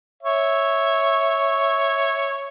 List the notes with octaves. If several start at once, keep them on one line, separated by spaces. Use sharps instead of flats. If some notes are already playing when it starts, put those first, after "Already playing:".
C#5 E5